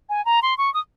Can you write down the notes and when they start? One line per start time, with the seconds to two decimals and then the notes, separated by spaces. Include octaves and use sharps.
0.09 G#5
0.25 A#5
0.42 C6
0.58 C#6
0.74 D#6